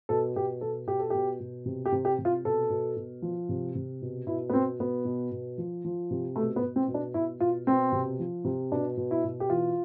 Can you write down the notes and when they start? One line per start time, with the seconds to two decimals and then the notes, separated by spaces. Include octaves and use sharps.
0.09 B2 A4
0.36 B2 G4
0.61 B2 A4
0.87 B2 G4
0.99 A4
1.10 B2 G4
1.40 B2
1.66 C3
1.85 G4
1.92 C3
2.05 G4
2.19 C3
2.25 F4
2.45 B2 A4
2.70 B2
2.96 B2
3.22 F3
3.49 C3
3.75 C3
4.02 B2
4.27 B2 E4
4.49 B3
4.53 B2 C4
4.80 B2 B3
5.05 B2
5.32 B2
5.58 F3
5.85 F3
6.11 C3
6.36 B2 A3
6.56 B3
6.62 B2
6.76 C4
6.88 B2
6.94 D4
7.14 B2 E4
7.40 B2 F4
7.67 B2 C4
7.92 C3
8.20 F3
8.45 C3
8.72 B2 D4
8.97 B2
9.11 E4
9.24 B2
9.40 G4
9.49 E3 F4